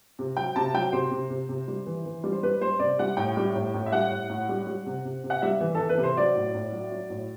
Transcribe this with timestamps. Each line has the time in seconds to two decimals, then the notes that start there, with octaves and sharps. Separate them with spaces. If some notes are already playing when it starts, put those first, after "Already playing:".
0.19 C3
0.37 F#3 G5
0.56 C3 A5
0.74 F#3 G5
0.92 C3 C5
1.11 C3
1.30 C3
1.49 C3
1.68 G3
1.86 E3
2.05 E3
2.24 G3
2.32 C5
2.43 G3 B4
2.61 G3 C5
2.79 C3 D5
2.99 G3 F#5
3.17 A2 G5
3.37 G3
3.55 A2
3.74 A2
3.86 E5
3.92 G3 F#5
4.11 A2
4.30 A2
4.49 G3
4.67 G3
4.86 C3
5.05 C3
5.24 C3
5.30 F#5
5.42 G3 E5
5.61 E3
5.75 E3 A4
5.89 B4
5.97 C3
6.03 C5
6.16 F#3 D5
6.36 A2
6.54 A2
6.72 F#3
6.92 F#3
7.10 A2